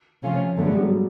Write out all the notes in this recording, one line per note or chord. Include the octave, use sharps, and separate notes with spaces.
C3 F3 A3 C#4 F4
G2 D3 F#3 A3 B3
G#3
G3
F#3 G#3